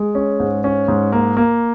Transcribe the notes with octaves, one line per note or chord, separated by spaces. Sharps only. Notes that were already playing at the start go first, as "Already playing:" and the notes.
Already playing: G#3
C#4
G#2
C#4
G#2
A#3
A#3